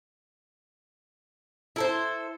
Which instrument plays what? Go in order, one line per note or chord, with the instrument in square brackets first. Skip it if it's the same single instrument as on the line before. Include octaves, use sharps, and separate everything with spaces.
[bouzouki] E4 A4 C5